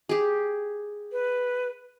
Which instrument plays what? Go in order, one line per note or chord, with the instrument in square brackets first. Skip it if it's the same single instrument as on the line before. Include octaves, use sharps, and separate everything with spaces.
[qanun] G4 G#4
[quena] B4